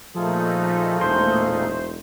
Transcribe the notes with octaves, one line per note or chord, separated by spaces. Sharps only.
A#2 F3 A3 D#4 F4 G#4 A4
E1 C5